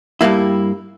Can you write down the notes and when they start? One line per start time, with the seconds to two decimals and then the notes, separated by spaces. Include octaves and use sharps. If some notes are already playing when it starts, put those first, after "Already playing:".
0.21 G2 G3 A#3 E4